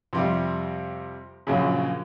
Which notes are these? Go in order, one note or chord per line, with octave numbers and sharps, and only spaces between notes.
F2 C3 G3
A#1 F#2 C#3